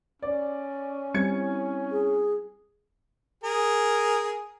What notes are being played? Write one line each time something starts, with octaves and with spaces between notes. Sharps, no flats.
C#4 D5
G3 C4 E4 G#6 C#7
G#4
G#4 A#4